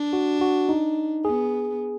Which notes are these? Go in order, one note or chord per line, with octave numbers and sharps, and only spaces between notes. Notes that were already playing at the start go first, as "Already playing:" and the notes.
Already playing: D4
F#4
F#4
D#4
B3 G#4